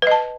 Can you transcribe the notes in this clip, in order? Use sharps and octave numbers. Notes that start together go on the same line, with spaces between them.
B4 D#5 A5